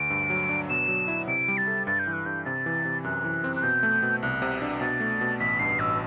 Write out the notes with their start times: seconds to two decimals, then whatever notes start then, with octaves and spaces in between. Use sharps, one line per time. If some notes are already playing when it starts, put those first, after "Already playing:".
Already playing: D2 D7
0.10 G2
0.30 F#3
0.49 D4
0.69 B2 E7
0.88 F#3
1.08 E4
1.28 C3 D7
1.48 G3
1.57 A6
1.67 A4
1.87 G2 A6
1.99 G6
2.07 E3
2.13 F#6
2.26 G2 G6
2.45 C3 A6
2.66 E3
2.85 C3
3.04 F#2 F#6
3.24 E3
3.44 C4
3.56 F#6
3.63 B2 G6
3.83 A3
4.02 B2
4.23 C2 F#6
4.42 C3
4.62 D4
4.81 B2 A6
5.00 A3
5.21 B2
5.40 A1 B6
5.59 G2 C7
5.79 A1 E6